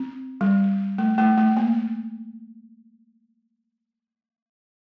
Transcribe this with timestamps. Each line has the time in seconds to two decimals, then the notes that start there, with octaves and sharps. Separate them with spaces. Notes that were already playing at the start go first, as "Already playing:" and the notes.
Already playing: C4
0.41 G3
0.98 A3
1.18 A3
1.38 A3
1.57 A#3